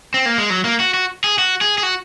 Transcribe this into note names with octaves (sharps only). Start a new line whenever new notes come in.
C4
A#3
G#3
F#3
A#3
F#4
F#4
G#4
F#4
G#4
G#4
F#4